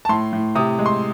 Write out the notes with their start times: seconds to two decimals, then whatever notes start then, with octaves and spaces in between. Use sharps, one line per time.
0.05 A5
0.09 A2 C6
0.33 A2
0.55 C3 D#6
0.79 G#3
0.86 C6